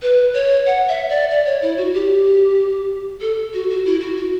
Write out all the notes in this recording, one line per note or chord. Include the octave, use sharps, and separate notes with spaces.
B4
C#5
F#5
E5
D5
D5
C#5
E4
F#4
G4
A4
F#4
F#4
E4
F#4
F#4